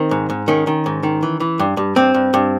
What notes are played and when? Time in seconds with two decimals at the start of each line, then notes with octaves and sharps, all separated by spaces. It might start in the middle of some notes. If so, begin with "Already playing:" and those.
Already playing: D#3 C4
0.11 G#2
0.30 G#2
0.48 D#3 C#4
0.67 D#3
0.86 G#2
1.03 D#3
1.23 E3
1.40 E3
1.59 G2
1.77 G2
1.96 G2 C4
2.14 G2
2.34 G2